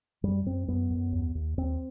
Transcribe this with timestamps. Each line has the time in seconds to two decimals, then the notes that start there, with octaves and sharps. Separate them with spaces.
0.23 F#2 G3
0.46 F#2 C4
0.68 F#2 B3
0.90 F#2
1.12 D#2
1.35 D#2
1.57 D#2 C4